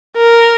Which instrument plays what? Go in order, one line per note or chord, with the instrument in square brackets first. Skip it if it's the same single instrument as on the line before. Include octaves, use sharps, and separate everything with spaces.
[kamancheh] A#4